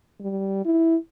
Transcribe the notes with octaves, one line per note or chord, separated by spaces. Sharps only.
G3
E4